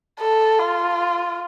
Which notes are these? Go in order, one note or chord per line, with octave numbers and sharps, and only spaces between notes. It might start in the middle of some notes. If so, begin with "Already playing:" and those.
A4
F4